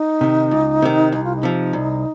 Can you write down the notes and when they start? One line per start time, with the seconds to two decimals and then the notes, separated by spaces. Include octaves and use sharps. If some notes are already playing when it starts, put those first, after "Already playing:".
Already playing: D#4
0.21 C3 D#3
0.51 C#2
0.82 C3 D#3
1.12 C2 D#4
1.24 F4
1.36 D#4
1.43 C3 F3
1.73 C2